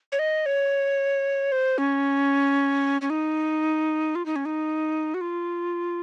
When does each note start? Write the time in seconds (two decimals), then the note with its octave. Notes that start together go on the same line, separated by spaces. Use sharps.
0.12 C#5
0.19 D#5
0.46 C#5
1.52 C5
1.78 C#4
3.01 C#4
3.10 D#4
4.15 F4
4.26 D#4
4.36 C#4
4.45 D#4
5.14 F#4
5.21 F4